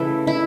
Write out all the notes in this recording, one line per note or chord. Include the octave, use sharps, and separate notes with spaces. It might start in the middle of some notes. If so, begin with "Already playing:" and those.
Already playing: C#3 E3 A3 E4
E4